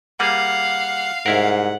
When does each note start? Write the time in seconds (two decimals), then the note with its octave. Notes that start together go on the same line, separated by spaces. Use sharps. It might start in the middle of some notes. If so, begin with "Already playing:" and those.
0.20 G3 A#3 G#4 F5 F#5
1.26 C2 G#2 E4 A#4 F#5